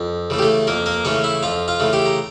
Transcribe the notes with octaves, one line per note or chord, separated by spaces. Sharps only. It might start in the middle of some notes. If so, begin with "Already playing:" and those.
Already playing: F2
C#3 E3 A3
G4
A3 A4
F2 A#3 A#4
A#3 A#4
C#3 E3 A3 C#4 C#5
E4 E5
F2 F4 F5
F4 F5
C#3 E3 A3
G4 G5
A#5